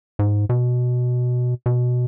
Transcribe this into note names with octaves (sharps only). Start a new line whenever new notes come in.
G#2
B2
B2